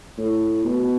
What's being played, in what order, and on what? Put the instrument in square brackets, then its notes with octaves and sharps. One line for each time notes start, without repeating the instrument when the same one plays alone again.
[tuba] A2
B2